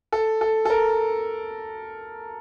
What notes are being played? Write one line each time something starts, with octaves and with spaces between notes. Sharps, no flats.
A4
A4
A4
A#4